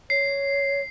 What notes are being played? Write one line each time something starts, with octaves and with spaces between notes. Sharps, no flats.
C#5 C7